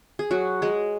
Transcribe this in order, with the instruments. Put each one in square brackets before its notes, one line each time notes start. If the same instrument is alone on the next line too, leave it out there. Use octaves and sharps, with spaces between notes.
[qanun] G#4
F#3 F#4
G#3 G#4